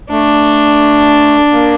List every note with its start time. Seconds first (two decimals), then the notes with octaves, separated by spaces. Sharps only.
0.11 A3 D4
1.51 A#3